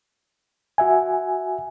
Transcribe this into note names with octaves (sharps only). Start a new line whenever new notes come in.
F#4 E5 G#5